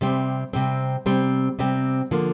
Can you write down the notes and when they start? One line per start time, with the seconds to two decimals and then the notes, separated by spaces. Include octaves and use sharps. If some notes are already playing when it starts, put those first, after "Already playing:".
0.01 C3 G3 C4
0.53 C3 G3 C4
1.06 C3 G3 C4
1.59 C3 G3 C4
2.11 D3 F3 A#3